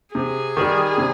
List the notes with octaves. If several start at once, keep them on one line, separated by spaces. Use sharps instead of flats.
C3 G#4
D#3 G3
C3